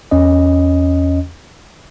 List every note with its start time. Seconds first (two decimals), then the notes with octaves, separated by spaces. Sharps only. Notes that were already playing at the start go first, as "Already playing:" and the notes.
0.11 E2 C#4 D#5